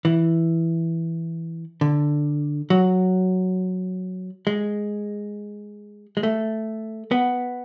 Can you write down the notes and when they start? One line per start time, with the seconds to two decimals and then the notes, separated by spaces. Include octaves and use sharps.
0.05 E3
1.81 D3
2.70 F#3
4.47 G#3
6.17 G#3
6.23 A3
7.11 B3